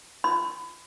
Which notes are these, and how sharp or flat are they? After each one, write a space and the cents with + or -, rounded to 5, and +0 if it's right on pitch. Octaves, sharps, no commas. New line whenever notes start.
B5 +30